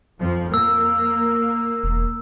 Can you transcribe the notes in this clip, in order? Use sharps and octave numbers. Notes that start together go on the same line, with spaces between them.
F2 F3
A#3 E6
E1